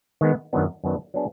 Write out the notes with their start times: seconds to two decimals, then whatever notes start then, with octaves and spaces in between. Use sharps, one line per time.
0.21 D#3 G#3 B3
0.53 F#2 D#3 F#3 B3 D4
0.84 F#2 D#3 F#3 B3 D4
1.14 F#3 B3 D4 G#4